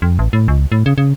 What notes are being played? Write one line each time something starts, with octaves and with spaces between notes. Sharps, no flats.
F2
A1
A2
C#2
A2
C#3
C#3